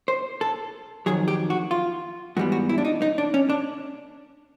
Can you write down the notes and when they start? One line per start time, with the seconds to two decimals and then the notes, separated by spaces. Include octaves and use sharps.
0.08 C5
0.41 A4
1.06 F2 C3 D#3 F#3 G#4
1.28 G4
1.50 F#4
1.71 F4
2.37 G#2 E3 G3 B3 F#4
2.52 F#4
2.69 E4
2.78 D4
2.85 D#4
3.02 D#4
3.18 D4
3.34 C#4
3.50 D4